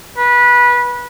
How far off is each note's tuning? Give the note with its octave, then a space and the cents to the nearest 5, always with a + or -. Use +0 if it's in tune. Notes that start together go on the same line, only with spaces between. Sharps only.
B4 -20